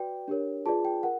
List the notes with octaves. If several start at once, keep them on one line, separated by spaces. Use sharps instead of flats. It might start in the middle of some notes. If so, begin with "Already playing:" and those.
Already playing: F#4 B4 D5 G5
D4 G4 A#4 C#5
F4 G#4 B4 D5 A5
G5
A#4 F#5